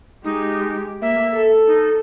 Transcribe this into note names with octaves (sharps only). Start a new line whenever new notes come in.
G#3 D#4 G4
A#3 E5
A4
D#4